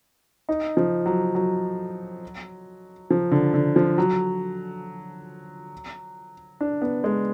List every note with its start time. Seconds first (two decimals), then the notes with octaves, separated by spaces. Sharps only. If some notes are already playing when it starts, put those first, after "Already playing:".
0.49 D#4
0.77 F3
1.06 F#3
1.35 F#3
3.10 F3
3.32 D3
3.54 D3
3.76 F3
3.98 F#3
6.61 D4
6.82 B3
7.04 G#3